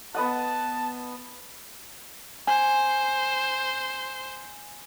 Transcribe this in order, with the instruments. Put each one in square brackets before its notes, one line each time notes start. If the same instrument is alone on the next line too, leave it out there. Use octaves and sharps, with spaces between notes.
[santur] B3 D#5 F#5 [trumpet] A5
[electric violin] C5 [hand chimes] G#5